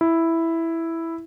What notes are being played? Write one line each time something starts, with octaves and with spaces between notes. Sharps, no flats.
E4